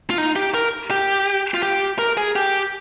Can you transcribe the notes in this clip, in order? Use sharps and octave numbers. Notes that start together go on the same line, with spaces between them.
F4
D#4
G4
A#4
G4
F4
G4
A#4
G#4
G4